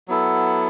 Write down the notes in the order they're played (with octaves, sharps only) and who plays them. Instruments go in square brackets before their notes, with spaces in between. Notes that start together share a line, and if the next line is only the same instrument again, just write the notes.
[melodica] F#3 B3 E4 A4